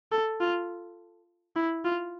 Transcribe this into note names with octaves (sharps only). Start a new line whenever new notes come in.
A4
F4
E4
F4